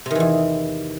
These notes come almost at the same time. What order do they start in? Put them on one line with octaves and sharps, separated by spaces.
C3 D#3 E3 E2